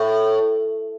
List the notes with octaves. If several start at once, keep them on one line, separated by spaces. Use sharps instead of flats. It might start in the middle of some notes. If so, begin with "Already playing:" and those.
Already playing: A2